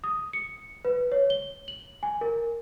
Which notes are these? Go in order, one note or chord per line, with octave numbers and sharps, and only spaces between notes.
D#6
C#7
B4
C#5
G7
F#7
G#5
A#4